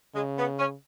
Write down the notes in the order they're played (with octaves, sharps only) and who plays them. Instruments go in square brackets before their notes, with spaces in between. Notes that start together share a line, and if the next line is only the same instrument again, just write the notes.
[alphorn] C#3 [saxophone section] G#3
[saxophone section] B3
C#4